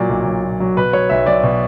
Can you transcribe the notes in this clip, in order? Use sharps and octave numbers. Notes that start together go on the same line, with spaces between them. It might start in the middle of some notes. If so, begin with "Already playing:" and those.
Already playing: A#2 F#3 D5
B1
B1
A#2
F#3
B2 B4
F#3 C#5
B1 E5
B1 D5
B2